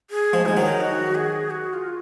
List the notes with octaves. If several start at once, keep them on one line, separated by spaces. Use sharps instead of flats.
G#4
F3 G#3
G#3 D#4
D#3 F#3
D#4
F#4
G#4
F#4
F4